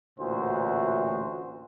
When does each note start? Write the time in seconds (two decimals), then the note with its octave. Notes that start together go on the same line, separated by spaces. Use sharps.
0.19 A1 D2 A#2 E3 F#4 C5